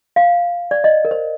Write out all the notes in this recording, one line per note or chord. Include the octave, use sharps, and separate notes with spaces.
F5
D5
D#5
A#4
C5